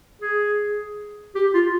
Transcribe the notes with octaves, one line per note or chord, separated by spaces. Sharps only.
G#4
G4
F4